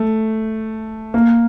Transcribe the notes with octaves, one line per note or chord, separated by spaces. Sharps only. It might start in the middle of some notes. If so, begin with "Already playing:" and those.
Already playing: A3
A#3